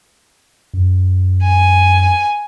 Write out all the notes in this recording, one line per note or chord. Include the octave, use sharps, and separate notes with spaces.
F#2
G#5